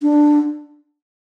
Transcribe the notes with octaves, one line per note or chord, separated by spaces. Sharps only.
D4